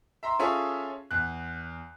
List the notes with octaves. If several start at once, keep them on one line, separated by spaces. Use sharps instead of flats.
E5 A#5 C6
C#4 F4 G#4 A4 C#5 E5
E2 F#6